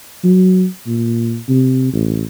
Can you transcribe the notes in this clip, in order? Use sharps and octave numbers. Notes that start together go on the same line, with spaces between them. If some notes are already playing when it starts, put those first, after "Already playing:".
F#3
A#2
C3
A1